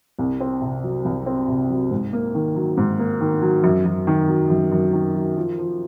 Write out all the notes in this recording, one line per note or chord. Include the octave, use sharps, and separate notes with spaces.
C2
C4
C3
F#3
C2
C4
C3
F#3
G#2
A#3
D#3
F#3
G#2
A#3
D#3
F#3
F#2
F#2
D#3
F#3
F#2
F#2
D#3
F#3
F3
F3